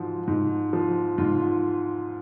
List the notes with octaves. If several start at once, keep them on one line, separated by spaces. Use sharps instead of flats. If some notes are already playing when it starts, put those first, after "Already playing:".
Already playing: G#2 F3 F#4
G#2
F3
G#2 F4
F4